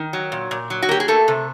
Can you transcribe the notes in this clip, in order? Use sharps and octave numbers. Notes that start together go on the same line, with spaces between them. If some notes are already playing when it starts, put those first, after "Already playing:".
Already playing: D#3
F#3
A#2
A#2
F#3
F#4
A#3 G4
G#4
A3 A4
C3